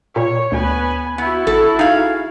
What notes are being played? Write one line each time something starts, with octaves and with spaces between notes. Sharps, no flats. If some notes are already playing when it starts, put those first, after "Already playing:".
A#2 C#5
D2 B3 B4 G#5
B3 E4 F#4
G#1 A4
D#4 G#4 F5